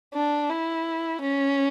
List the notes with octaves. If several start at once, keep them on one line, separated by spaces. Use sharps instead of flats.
D4
E4
C#4